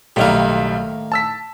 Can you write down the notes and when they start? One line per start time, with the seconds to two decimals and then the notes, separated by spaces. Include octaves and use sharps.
0.16 B1 A2 D#3 G3 A#3
1.12 A5 E6 B6